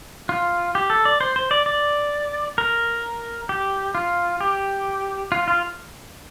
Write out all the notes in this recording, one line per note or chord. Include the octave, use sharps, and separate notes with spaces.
F4
G4
A4
D5
C5
C5
D5
D5
A#4
G4
F4
G4
F4
F4